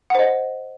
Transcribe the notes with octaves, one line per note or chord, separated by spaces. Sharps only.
C5 D#5 F#5